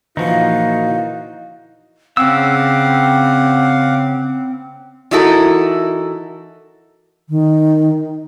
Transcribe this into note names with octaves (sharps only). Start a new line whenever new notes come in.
A#2 E3 F3 D#4 E4 F#4 F5
C#3 C4 F5 F#5 D6 E6
E3 D#4 E4 F#4 A4 A#4
D#3